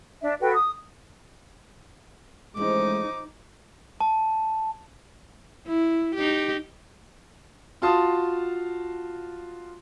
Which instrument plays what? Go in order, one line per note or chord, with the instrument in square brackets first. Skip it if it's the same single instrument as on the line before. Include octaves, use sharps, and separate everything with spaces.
[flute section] D4 E5
F#4 A4 B4 G5
D#6
[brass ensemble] A1 A2 G#3 [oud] F3 [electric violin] D#4 D6
[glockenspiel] A5
[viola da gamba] E4
D#4 G4
[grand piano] F4 F#4 F5 A5 C6 D#6